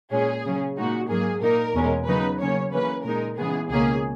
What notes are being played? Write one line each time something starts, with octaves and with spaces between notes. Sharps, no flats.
A#2 G#3 C#4 G#4
C#3 F#3 C#4
A#2 G#3 D#4 F#4
G#2 F#3 A#3 G#4
A#2 A#3 D#4 A#4
E2 B2 G#3 C#4
C#3 F#3 B3 D#4 B4
C#3 F#3 A#3 C#4 C#5
C#3 E3 A#3 C#4 B4
A#2 G#3 D#4 A#4
C#3 E3 G#3 B3 G#4
C#2 B2 A#3 C#4 G#4